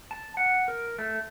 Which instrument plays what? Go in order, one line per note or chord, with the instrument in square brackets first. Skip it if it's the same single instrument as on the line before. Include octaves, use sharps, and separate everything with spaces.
[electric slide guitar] A5
F#5
A#4
A3